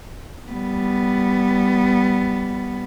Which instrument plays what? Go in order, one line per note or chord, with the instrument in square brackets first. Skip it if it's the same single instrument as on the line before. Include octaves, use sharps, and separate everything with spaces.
[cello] G3 B3